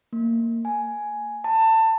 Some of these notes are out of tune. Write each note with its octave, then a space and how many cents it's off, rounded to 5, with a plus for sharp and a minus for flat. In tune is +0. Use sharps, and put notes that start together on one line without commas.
A#3 -20
G#5 +10
A5 +25